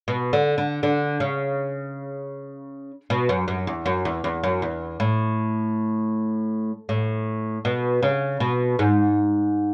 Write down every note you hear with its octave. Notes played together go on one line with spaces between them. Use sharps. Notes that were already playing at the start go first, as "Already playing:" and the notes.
B2
D3
D3
D3
C#3
B2
F#2
F#2
E2
F#2
E2
E2
F#2
E2
A2
A2
B2
C#3
B2
G#2